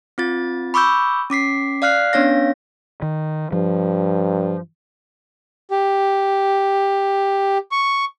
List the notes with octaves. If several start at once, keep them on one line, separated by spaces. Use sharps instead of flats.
C4 F4 A6
B5 C#6 D6 E6 G6
C#4 D6 B6 C7
D5 F5 F6 F#6 C7
B3 C#4 D4 C#5 F5 A#6
D#3
G2 F3
G4
C#6